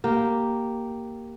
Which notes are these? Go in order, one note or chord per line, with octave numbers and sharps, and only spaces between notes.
A#3 G4